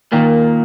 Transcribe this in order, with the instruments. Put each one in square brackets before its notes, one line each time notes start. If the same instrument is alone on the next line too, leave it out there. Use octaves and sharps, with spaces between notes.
[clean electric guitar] A#2 A#3 [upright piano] D#3